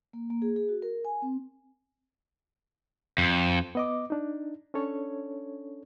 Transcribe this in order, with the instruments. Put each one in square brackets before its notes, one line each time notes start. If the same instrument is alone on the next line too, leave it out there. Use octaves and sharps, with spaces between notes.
[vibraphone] A#3
A#3
G#4
G#4
F#4
A#4
G#5
C4
[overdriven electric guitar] F2
[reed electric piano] B3 D#5 D6
D4 D#4
C#4 D4 A4 C#5